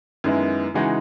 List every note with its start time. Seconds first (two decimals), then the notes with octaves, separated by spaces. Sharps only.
0.24 F#2 D#3 G#3 B3 E4
0.74 C#3 E3 G#3 D#4 F#4